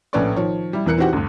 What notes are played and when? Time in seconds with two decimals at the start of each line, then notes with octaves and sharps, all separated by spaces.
0.13 A#1 A2 C#4 B4 D5 C#6
0.36 D#3 F3 C#5
0.73 G3 E4
0.86 E2 E3 A#4 F#6 C#7
0.98 E3 C4 D#4 F#4 G4 F#5
1.13 D2 G2